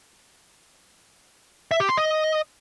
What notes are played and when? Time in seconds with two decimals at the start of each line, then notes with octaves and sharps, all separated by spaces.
1.71 E5
1.80 G4
1.89 C6
1.97 D#5